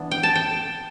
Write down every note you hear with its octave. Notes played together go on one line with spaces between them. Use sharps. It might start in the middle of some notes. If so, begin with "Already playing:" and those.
Already playing: E3 B3 D4
G5
A5
G5